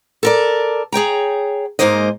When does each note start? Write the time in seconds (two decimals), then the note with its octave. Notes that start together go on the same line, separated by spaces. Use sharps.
0.23 A4 A#4 D5
0.92 G#4 C#5 G5 A#5
1.79 G#2 C#3 G#3 A#3 C5 D#5